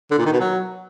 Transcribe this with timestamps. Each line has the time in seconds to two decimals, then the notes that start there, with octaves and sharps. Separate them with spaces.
0.11 D3
0.18 A#2
0.26 D#3
0.33 B2
0.40 F#3